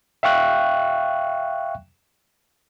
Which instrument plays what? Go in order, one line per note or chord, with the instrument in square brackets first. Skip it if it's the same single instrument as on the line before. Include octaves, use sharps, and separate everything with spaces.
[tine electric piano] E5 F5 G5 C#6 F#6